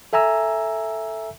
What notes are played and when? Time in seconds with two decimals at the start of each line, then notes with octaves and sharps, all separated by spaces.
0.13 A4 E5 G#5 A#5 E6